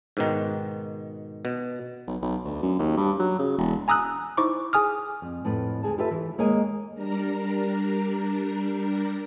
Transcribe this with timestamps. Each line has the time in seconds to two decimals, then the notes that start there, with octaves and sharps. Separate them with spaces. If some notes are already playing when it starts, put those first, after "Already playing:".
0.17 G#2 B2 D#3
1.45 B2
2.07 B1
2.22 B1
2.44 D2
2.62 F#2
2.79 D#2
2.97 G2
3.19 F#3
3.39 C#3
3.58 E1
3.88 G#5 A#5 D#6 E6 F#6
4.37 D#4 E4 C5 C#6 D6
4.73 G#4 G#5 D#6 F6
5.22 F2
5.45 F2 A2 B4
5.83 D2 G2 G#4 A5
5.98 F4 G4 A4 B4 E5
6.11 E3
6.38 D#2 G#3 A#3 C#5 D#5 G#5
6.95 G3 D4 A#4 A#5